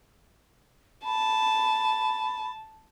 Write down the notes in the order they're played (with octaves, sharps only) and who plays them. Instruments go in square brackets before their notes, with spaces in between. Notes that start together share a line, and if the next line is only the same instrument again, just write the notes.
[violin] A5 [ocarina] B5